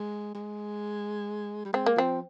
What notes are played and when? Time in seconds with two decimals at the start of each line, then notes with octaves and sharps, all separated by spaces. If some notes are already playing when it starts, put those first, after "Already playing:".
Already playing: G#3
0.35 G#3
1.65 G3
1.73 G#3 C4
1.86 A#3
1.96 F3 C4